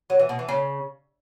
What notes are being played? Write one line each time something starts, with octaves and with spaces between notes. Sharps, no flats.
F#3
E3
B2
E3
C#3